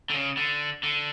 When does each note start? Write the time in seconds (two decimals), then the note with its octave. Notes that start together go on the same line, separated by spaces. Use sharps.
0.10 D3
0.14 C#3
0.37 D3
0.83 D3